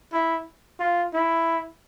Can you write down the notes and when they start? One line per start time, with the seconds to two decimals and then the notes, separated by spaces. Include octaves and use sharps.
0.13 E4
0.79 F4
1.14 E4